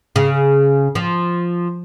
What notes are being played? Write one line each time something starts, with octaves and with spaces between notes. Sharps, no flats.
C#3
F3